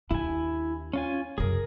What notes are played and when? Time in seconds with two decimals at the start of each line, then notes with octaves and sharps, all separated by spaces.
0.11 D#2 D4 E4 G#5
0.93 C#4 F4 G#5
1.38 F#2 C#3 G#4 A#4